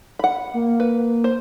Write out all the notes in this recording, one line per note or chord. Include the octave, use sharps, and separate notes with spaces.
F#5 B5
A#3
B4
C5